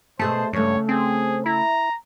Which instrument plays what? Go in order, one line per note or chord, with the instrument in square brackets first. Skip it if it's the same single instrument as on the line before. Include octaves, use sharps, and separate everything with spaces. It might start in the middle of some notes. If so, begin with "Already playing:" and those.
[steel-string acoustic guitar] B2 G#4 A5 [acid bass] A3 [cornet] C5
[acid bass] G2 [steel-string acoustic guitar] C#3 A3 [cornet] C#5
[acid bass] C4 [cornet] G#4
[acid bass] E4 [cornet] A#5